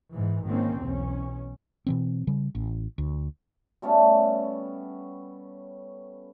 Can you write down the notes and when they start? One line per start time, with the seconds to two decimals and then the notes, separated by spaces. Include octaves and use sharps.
0.12 G#2 E3
0.48 G#1 D#3 A#3 C4 C#4
0.83 B1 E2 B2 C#4
1.87 B2 E3 C4
2.27 C#3 G3
2.55 A1
2.98 D2
3.82 G3 A3 B3 C#4